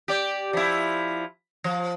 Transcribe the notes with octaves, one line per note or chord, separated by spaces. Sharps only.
G4 D5
F3 E4
F3